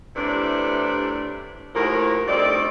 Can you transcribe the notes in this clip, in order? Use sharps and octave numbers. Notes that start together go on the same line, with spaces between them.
A2 C3 E3 G3 D4
D#2 A2 F3 A#4
D2 G3 A3 C4 D#4 D5